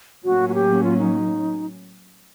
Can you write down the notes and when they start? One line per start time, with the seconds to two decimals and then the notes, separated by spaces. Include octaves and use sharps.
0.23 A2 F#3 A#3 C#4 F#4
0.49 F#4
0.54 G4
0.84 F4
0.99 D#4